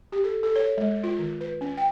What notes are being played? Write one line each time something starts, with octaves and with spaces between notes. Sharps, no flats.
G4
A4
A4
C#5
G#3
F4
D#3
B4
C#4
G5